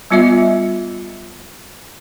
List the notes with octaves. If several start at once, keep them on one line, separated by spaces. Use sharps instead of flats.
G3 B3 F4 D#5 E5